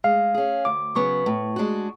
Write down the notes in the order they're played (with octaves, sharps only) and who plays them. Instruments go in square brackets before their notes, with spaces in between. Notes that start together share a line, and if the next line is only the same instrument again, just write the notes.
[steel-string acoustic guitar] G#3 [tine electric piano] F5
[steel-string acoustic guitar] C#4 G#4
[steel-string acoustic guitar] D2 [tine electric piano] D6
[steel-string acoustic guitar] C#3 F#3 B3 [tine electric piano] C#6
[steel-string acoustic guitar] A2
G#3 D4 F#4